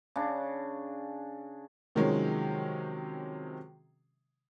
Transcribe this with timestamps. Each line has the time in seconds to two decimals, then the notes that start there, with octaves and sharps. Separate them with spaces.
0.16 C#3 D4
1.95 C3 D#3 F3 F#3 G#3 C#4